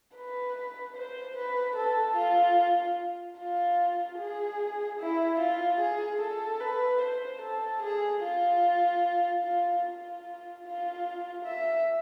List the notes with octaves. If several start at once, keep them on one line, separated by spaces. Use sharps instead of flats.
B4
C5
B4
A4
F4
F4
G#4
E4
F4
G#4
A4
B4
C5
A4
G#4
F4
F4
F4
F4
E5